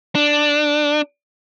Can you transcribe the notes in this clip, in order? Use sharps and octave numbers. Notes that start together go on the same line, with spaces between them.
D4